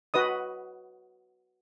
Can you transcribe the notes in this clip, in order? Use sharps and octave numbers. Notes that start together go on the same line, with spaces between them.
F#4 B4 D#5 D#6